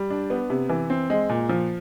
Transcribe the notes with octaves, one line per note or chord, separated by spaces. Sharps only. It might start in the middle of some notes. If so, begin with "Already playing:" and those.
Already playing: G3
D4
B3
C3
E3
C4
G#3
A#2
F3